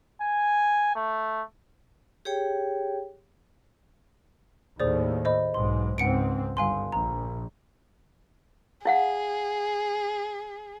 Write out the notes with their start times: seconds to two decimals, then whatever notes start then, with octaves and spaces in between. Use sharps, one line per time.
0.22 G#5
0.95 A3
2.25 G4 G#4 C#5 G5
4.80 D#2 A2 G#4 C5 D5
5.25 C5 D#5 B5
5.54 B1 G#2 C6
5.98 C#2 G#2 C4 F#5 C#7 D7
6.57 G1 G2 F5 G#5 C6
6.92 A#1 A#5
8.85 E4 G#4 F5 F#5